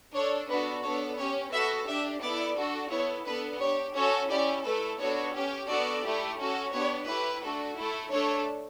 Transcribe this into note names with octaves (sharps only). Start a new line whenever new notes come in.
D4 A4 C#5
B3 D4 F#4 A4 B4
B3 D4 A4 C#5
C#4 G4 C#5
B3 F#4 A4 E5
D4 G4 E5
B3 E4 A4 D5
D4 F#4 A4
B3 E4 A4 C#5
B3 D4 A4 B4
D4 G4 C#5
C#4 F#4 A4 C#5
C#4 E4 G4 D5
A3 E4 A4 B4
B3 D4 F#4 A4 C#5
C#4 G4
B3 D4 F#4 A4 D5
A3 E4 G4
C#4 F#4 A4
B3 D4 G4 C#5
A3 E4 G4 B4
A3 D4 F#4 A4
A3 E4 A4
A3 D4 A4 C#5